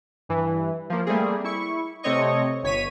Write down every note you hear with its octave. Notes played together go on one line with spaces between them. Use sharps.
G2 E3
F3 A#3
G3 A3 A#3 C4 G#4
E4 C#6
C3 A3 C4 C#5 D#5 C#6
G1 C#5 B6 D#7